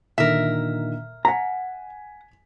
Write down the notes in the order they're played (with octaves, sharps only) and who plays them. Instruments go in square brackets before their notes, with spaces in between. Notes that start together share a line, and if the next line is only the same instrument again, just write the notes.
[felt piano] A#2 D3 D#3 [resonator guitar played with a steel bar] A#4 E5
[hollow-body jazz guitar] F#5 A#5 [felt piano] G#5 B6